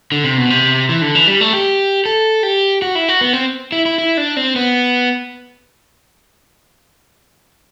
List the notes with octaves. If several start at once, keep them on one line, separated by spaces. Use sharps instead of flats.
D3
C3
B2
C3
E3
D3
E3
G3
A3
G4
A4
G4
F#4
E4
F#4
B3
C4
E4
E4
E4
D4
C4
B3